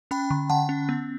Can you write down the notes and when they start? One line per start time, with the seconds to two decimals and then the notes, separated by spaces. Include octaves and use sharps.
0.11 C#4 G5 B5
0.30 D3
0.50 D3 F#5 A5
0.69 C#4
0.89 B3